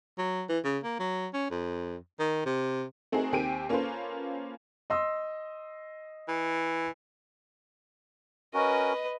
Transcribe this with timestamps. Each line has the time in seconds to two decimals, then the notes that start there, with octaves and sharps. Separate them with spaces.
0.18 F#3
0.49 E3
0.64 C#3
0.83 A#3
0.99 F#3
1.33 C#4
1.50 F2
2.19 D#3
2.46 C3
3.12 A3 C4 D#4 F#4 G#4 A#4
3.32 D#2 C4 G4 G#5 D7 D#7
3.69 A#3 C#4 F4 A4 B4 C5
4.90 D#5 C6 E6
6.28 E3
8.54 C#4 F#4 A#4 B4 D#5